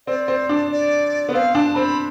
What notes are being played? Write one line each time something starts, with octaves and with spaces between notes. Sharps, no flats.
C4 D5
C4
D4
D5
B3
C4 F5
D4 A5
C4 B5